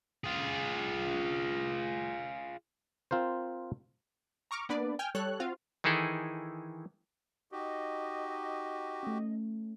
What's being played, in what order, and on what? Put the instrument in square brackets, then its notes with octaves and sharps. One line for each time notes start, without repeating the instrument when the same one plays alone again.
[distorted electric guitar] F4 G#4
[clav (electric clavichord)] C4 F4 A#4 C5
[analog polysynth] A#5 C#6 D6 F6
A#3 B3 D4 B4 D5
G5 G#5 F6
G3 A4 C#5 F#6
C4 F4 F#4 F5
[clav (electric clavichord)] D#3 E3 D#4 E4 G#4 A4
[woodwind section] D#4 D#5 [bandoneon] F#4 G4
[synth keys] A3 C#4